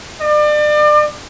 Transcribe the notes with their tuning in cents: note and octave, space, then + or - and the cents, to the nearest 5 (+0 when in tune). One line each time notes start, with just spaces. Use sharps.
D5 +35